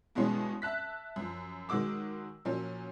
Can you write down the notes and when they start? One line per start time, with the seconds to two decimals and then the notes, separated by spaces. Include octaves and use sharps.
0.15 G2 B2 E3 G#3 B3 C#4
0.62 E5 A5 F#6 B6
1.16 F#2 F3
1.69 D#3 F#3 G#3 F#4 D6 E6
2.45 A#2 F3 F#3 C#4